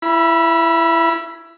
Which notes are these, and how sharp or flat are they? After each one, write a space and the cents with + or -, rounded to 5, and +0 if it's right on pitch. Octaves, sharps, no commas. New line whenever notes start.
E4 +20 B5 -25